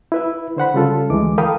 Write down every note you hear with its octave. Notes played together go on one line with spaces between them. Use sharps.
E4 B4 E5
D3 C5 F#5 B5
C#3 G3 F4 A4
D2 E3 G#3 D6
A4 A#4 F5 G5 B5 D#6